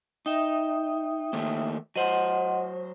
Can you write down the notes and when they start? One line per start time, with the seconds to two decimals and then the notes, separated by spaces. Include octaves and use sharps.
0.26 D#4 E5 G5 D#6
1.33 D#3 A3 A#3
1.96 F#3 C5 D#5 F#5 C6